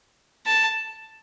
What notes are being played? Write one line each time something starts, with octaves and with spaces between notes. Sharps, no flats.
A5